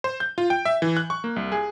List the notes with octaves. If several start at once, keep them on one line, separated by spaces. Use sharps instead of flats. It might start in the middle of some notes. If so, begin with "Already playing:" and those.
C5
G6
F4
G5
E5
E3
F#6
C#6
A#3
C2
G#4